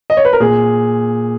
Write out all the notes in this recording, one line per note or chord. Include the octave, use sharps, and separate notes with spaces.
D#5
C#5
B4
A#4
A#2 G#4